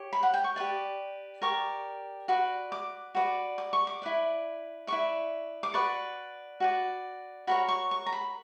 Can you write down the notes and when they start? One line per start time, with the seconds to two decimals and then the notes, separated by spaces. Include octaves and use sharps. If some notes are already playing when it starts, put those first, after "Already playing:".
Already playing: G4 C#5
0.13 B5
0.23 F#5
0.34 G5
0.44 C#6
0.56 G4 B4 D5
1.42 G4 A#4 D5 C#6
2.28 F#4 B4 D5
2.72 D6
3.15 F#4 B4 D5
3.58 D6
3.73 C#6
3.87 D6
4.02 E4 B4 D5
4.87 E4 B4 D5 C#6
5.63 D6
5.74 F#4 B4 D5 C#6
6.60 F#4 B4 D5
7.47 F#4 A#4 C#5 B5
7.68 C#6
7.91 C#6
8.06 A#5
8.13 B5